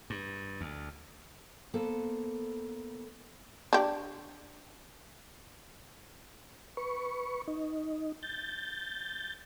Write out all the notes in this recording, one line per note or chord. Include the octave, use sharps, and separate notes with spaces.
G2
D2
A#3 B3 A4 C5
D4 G4
B4 C#6
D#4
G6 A6